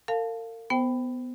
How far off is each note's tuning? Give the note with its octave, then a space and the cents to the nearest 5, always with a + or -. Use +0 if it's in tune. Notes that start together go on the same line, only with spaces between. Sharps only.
A#4 -45 F5 +0 A5 -5
B3 +15 C5 +0 G5 +0